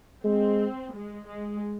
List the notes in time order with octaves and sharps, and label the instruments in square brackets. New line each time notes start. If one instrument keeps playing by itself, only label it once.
[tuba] G#3 [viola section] C4
[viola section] G#3
G#3